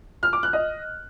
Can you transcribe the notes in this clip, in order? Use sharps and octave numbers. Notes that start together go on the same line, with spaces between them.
F6
D6
F#6
D#5